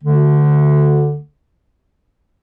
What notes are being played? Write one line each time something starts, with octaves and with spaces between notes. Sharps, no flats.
D2 D3 A3